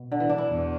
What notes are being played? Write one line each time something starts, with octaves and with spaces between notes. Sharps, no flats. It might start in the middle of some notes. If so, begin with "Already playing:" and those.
Already playing: B2
D3
E3
D4
E4
E2